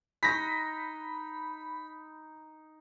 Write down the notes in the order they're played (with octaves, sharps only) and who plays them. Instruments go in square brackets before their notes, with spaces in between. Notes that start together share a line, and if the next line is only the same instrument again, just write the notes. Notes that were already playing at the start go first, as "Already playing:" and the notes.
[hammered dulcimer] D#4 [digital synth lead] B5 [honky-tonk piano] A#6 B6